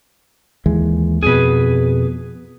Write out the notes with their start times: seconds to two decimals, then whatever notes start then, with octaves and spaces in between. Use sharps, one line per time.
0.66 D#2 E3 G#3
1.23 F2 B2 G#4 B4